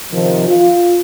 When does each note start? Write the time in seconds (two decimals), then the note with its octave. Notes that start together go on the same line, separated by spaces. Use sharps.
0.12 C3 D#3 F3
0.48 F4